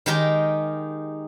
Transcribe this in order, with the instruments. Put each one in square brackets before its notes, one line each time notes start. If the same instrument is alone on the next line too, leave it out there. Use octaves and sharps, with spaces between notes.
[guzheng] D#3 G#3 D#4 G4 A#4